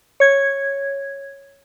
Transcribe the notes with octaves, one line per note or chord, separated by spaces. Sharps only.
C#5 G#6